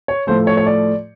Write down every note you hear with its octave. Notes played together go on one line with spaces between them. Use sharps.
C#5
A2 F3 A3 C5
C#5
C#5
D5